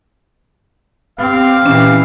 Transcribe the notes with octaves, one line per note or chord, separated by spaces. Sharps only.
C4 G4 F5
A#2 E3 C#4